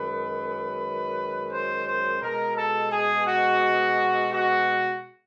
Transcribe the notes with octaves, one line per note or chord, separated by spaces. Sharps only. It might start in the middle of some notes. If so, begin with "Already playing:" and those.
Already playing: F#2 D#3 G#3 B4
C5
C5
B2 G#3 A#4
A4
G#4
F#4
F#4